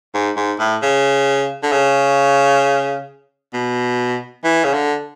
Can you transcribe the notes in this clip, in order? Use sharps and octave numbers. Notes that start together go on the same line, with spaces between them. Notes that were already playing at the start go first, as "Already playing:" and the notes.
G#2
G#2
A2
C#3
D3
C#3
B2
E3
C#3
D3